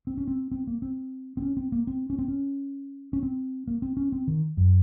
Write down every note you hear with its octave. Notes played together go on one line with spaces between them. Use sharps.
C4
C#4
C4
C4
A#3
C4
C4
C#4
C4
A#3
C4
C#4
C4
C#4
C#4
C4
A#3
C4
C#4
C4
D#3
F#2